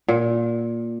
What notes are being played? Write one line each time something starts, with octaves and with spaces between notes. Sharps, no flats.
A#2